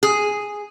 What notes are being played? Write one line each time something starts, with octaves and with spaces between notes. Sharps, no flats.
G#4